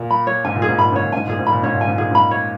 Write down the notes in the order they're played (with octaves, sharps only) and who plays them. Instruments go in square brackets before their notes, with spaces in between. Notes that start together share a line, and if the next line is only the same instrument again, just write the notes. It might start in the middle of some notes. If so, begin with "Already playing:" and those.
Already playing: [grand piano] A#2
[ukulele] B5
C#5
[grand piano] G#2 [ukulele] G#5
[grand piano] A#2
[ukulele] G#4
[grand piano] G#2
[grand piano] A#2 [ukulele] B5
[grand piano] G#2 [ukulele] C#5
[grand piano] A#2
[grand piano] G#2 [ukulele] G#5
[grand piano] A#2 [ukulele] G#4
[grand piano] G#2
[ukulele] B5
[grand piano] A#2
[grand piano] G#2 [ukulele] C#5
[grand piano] A#2
[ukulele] G#5
[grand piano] G#2
[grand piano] A#2 [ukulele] G#4
[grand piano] G#2 [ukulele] B5
[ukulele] C#5